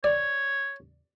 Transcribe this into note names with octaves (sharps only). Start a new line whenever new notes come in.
C#5 D5